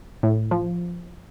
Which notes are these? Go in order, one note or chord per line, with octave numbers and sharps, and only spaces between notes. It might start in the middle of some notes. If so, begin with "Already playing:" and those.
A2
F3